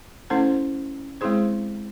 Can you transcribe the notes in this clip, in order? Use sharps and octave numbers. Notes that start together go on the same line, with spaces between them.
A3 C#4 E4 A4 C5
G#3 C4 E4 G#4 C5